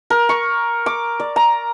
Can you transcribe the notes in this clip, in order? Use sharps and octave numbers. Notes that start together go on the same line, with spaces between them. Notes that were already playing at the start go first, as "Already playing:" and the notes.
A#4
C#6
D6
D5
A#5